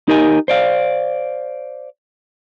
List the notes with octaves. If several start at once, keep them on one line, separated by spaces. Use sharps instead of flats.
D#4 G4 A#4 D#5 G#5
C5 D5 F5